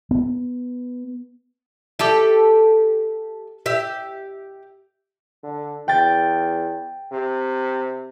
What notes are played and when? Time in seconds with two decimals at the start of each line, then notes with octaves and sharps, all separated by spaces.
0.11 B3
1.99 G4 A4 E5
3.66 G4 E5
5.43 D3
5.88 E2 G5 A6
7.12 C3